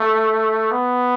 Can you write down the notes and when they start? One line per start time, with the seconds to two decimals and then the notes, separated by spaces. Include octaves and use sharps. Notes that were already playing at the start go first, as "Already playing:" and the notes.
Already playing: A3
0.71 B3